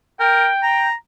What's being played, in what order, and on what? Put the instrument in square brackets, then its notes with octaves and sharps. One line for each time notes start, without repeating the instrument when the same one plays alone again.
[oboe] A#4 [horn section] G5
[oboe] A#5